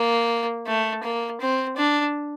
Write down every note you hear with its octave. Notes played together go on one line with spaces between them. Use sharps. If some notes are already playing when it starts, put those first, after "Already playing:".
Already playing: A#3
A3
A#3
C4
D4